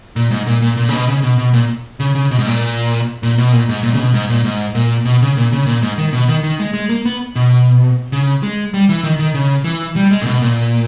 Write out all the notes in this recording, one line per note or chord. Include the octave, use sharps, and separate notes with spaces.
A#2
G#2
A#2
A#2
A#2
C#3
B2
C#3
B2
B2
A#2
C#3
C#3
B2
G#2
A#2
A#2
B2
A#2
G#2
A#2
C#3
B2
G#2
A#2
G#2
A#2
B2
C#3
A#2
C#3
A#2
G#2
D#3
B2
D#3
D#3
G#3
G#3
A#3
B3
B2
C#3
G#3
G3
E3
D#3
D#3
C#3
E3
G3
G#3
A#2
B2
A#2